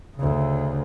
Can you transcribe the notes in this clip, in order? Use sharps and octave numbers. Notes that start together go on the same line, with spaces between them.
D2 C#3